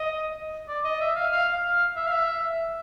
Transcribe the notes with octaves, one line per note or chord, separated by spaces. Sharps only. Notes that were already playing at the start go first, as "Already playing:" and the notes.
Already playing: D#5
D5
D#5
E5
F5
F5
F5
E5
F5
E5